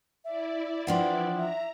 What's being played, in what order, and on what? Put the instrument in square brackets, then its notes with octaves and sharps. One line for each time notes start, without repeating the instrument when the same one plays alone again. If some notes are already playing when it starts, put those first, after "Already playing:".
[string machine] E4 D5 [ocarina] E5
[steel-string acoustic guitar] E3 F3 D4 [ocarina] B4 [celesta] F#5 G5 C6
[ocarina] E5 [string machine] A#5